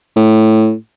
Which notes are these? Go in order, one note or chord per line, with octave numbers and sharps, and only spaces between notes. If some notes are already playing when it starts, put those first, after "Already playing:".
A2